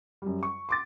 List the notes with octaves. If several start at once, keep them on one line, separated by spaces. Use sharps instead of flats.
F#2 G3
C#6
C6 D6 A6